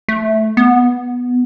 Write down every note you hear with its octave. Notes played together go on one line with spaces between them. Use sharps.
A3
B3